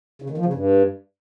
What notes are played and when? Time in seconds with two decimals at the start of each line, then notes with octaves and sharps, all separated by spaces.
0.22 C#3
0.30 D#3
0.38 F3
0.46 C#3
0.54 G2